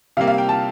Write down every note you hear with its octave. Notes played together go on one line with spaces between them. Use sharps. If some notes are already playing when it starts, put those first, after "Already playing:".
C3 G3 A#3 F5
F5
G5
A5